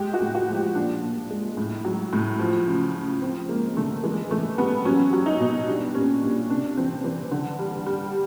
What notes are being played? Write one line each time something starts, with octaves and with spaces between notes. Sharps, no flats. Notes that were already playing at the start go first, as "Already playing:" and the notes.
Already playing: G#3 G4
F#4
A2
F#4
F3
G4
A#2 D4
A#2
G#3
A2
F#3
A2
F3
C#3
C#3
F3 C4
G#3 A#3
D3 A3
E3 G#3
E3 A3
G3 B3
F#3 C#4
F#3
D#4
B2
G3 D4
A#2 C#4
A#2 D4
C3 D4
E3 C4
E3
D3
G3
G3